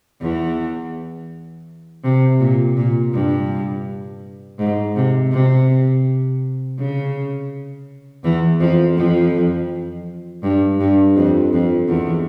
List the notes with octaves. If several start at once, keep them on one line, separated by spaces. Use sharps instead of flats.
E2 E3
C3
A#2
A#2
G2
G#2
C3
C3
C#3
E2 E3
F2 F3
F2 F3
G2
G2
F2
F2
E2